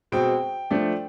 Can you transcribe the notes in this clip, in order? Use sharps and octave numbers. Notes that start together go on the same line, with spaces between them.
B2 G#3 C4 G5
F3 A3 D4